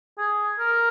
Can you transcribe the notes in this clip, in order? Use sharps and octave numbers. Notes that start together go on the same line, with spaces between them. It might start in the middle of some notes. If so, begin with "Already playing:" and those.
G#4
A#4